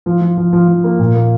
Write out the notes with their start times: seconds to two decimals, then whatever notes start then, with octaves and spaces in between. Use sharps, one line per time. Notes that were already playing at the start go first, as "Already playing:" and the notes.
0.06 F3
0.21 F3
0.37 F3
0.53 F3
0.68 F3
0.84 A#3
0.99 A#2
1.15 A#3